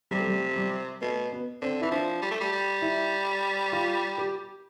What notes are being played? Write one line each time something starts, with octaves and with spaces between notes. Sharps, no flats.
C3 G3
A3
G3
G3
B2 A3
B3
D3 C4
E3 E4
F3 D4
G3
A3
G3
G3
E4
F4
G4